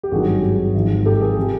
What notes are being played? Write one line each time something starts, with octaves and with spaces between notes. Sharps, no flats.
G4
G#1 G2 D#3 F#3 F#4 G#4
G#1 G#2 F3
G4 A4
G#4 A#4
C3 F3